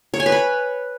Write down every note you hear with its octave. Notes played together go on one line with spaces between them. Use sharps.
C#5
G#5
B4
B5